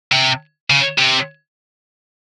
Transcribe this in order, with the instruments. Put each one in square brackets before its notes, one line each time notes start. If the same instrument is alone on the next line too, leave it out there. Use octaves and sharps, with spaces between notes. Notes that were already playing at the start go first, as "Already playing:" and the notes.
[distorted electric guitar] C3
C#3
C3